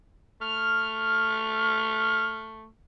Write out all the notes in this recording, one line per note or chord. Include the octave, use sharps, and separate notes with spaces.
A3 F6